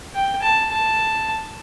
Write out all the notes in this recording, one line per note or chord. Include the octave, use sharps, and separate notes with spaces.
G5
A5
A5